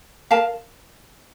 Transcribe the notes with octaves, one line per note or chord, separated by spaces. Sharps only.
A#4 F5 A5